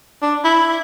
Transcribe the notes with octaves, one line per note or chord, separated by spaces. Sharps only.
D4
E4